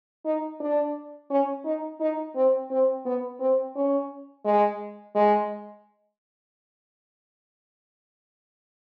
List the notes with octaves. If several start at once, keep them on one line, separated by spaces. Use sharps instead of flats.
D#4
D4
C#4
D#4
D#4
C4
C4
B3
C4
C#4
G#3
G#3